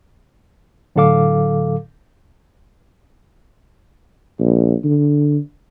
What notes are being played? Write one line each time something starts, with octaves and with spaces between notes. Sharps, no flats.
A2 D3 F#3 A4 F5 D6
A#1
D3